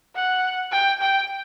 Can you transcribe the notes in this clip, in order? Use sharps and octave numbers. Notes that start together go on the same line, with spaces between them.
F#5
G5
G5